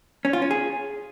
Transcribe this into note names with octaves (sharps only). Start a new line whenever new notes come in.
C#4
F4
C#4
G#4